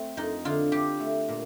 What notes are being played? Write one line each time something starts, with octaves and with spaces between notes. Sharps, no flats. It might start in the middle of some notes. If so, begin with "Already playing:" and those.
Already playing: A3 C4
F2 D#4
D3 F4
G3 G4
A3
A#2